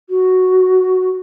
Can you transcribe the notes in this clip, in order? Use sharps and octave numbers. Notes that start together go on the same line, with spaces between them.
F#4